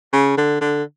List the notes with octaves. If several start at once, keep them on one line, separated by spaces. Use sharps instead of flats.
C#3
D3
D3